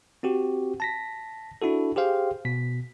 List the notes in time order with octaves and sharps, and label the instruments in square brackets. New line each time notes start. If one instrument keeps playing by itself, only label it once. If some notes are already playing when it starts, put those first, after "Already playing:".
[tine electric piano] C4 F#4 G4
A5 A#6 B6
D4 E4 F#4 A4
G4 G#4 C5 F5 G5
B2 B6